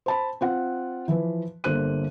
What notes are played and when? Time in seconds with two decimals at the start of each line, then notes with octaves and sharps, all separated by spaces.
0.06 C5 A5 B5
0.41 C4 F4 F#5
1.08 E3 F3 B4
1.64 G1 D3 A#3 C5 F#6 D#7